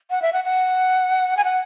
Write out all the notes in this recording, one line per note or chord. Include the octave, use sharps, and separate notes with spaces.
F#5
E5
F#5
F#5
G#5
F#5